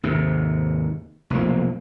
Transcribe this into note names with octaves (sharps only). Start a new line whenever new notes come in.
D#2 G#2 C3
F1 B1 F3 A#3